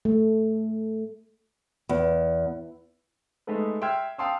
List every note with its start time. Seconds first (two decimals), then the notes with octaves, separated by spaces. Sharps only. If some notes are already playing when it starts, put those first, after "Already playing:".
0.05 A3
1.89 E2
3.47 G#3 A3 D#4 A4 B4
3.81 E5 G5 C6 E6 F6 G#6
4.18 F5 G5 A5 C6 D#6 E6